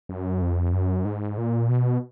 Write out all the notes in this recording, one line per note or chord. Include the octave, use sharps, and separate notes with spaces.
F#2
F2
F#2
G#2
A#2
B2